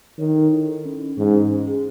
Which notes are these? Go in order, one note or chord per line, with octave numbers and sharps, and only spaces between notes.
D#3 C#5
A4
E4
A4
C#4
C#4
G#2 E3
C#4
C#4
G#4